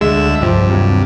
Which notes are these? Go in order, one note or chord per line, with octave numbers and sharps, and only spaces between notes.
D2 G#3 E5
C2 G2 F3
D#2 C3 F#3